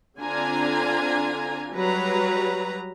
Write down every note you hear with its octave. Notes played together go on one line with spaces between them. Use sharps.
D3 C4 D4 F4 G#5 A#5
F#3 G3 B4 A#5